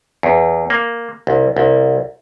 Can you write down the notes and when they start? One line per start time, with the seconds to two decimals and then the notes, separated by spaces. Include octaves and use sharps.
0.23 E2
0.70 A#3
1.27 C2
1.57 C2